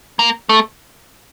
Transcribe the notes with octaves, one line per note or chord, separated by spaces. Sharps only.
A#3
A3